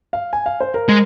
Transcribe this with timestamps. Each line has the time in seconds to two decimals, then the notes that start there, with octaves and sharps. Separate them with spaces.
0.13 F5
0.33 G#5
0.46 F5
0.60 C5
0.74 A#4
0.89 G#3